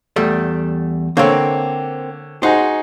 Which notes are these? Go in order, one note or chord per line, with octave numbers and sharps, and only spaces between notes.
E2 G3 A3
D3 A#3 C4 C#5
D#4 F#4 G#4 C5